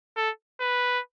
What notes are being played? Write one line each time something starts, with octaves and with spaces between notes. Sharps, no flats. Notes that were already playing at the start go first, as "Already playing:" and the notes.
A4
B4